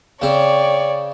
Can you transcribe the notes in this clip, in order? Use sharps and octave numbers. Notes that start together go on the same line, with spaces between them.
C#3 C4 C#5 D5